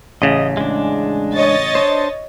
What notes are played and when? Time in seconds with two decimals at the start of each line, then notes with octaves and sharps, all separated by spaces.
0.22 A1 C#3 D#5
0.57 G#3 D4
1.33 C#5 D#5 A6
1.75 D4 C5